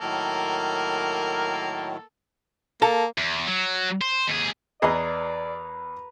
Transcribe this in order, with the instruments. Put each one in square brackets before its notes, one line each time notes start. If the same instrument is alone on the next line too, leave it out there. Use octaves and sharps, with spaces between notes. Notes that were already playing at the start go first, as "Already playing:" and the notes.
[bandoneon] A2 D#3 F#3 [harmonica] A#3 A4 A#4
[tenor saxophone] A#3 [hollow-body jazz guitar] A4 A5 A#5
[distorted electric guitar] E2
F#3
C5
D#2 G#4
[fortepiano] E2 G#4 D#5 [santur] B4 A#5 [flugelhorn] D5